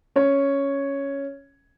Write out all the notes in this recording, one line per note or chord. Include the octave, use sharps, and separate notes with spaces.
C#4 C#5